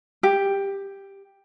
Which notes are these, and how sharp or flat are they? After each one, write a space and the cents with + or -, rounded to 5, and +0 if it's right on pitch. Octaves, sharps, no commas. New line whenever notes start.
G4 +10